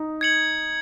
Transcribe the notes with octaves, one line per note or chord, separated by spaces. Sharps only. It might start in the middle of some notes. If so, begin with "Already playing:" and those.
Already playing: D#4
G#6 C#7 F#7